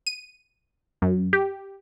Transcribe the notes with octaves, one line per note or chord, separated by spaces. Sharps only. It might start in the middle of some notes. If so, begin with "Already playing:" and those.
D#7
F#2
G4